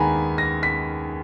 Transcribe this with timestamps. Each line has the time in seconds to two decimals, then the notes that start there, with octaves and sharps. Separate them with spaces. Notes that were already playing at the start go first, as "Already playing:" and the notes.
Already playing: D#2 D#3 G#3 B3 G#5 A#5 B5
0.38 A#6
0.63 B6